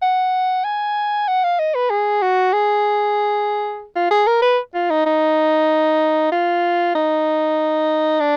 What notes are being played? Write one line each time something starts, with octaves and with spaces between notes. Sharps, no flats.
F#5
G#5
F#5
F5
D#5
B4
G#4
F#4
G#4
F4
G#4
A#4
B4
F4
D#4
D#4
F4
D#4
D4